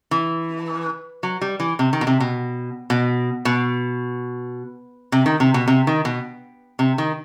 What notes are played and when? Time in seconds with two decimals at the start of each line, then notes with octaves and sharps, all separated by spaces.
0.11 E3
1.23 F#3
1.41 G3
1.60 E3
1.79 C3
1.93 D#3
2.01 B2
2.07 C3
2.20 B2
2.90 B2
3.45 B2
5.12 C3
5.26 D#3
5.40 C3
5.54 B2
5.67 C3
5.87 D#3
6.05 B2
6.79 C3
6.98 D#3